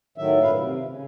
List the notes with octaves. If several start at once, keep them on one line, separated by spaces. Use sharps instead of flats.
A2 D#3 F#3 E5
G2 A#2 B4 F5
C3
C#3